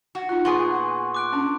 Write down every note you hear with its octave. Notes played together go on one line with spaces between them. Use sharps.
F#4 F#5
D#4 F4 F#6
A#2 B3 G#4 F#5 C6 C#6
D6 F#6 D7
C#4 D4